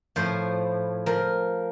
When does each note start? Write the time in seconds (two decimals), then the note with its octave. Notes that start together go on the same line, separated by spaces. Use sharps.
0.16 A2 F3 C5
1.06 F3 A#4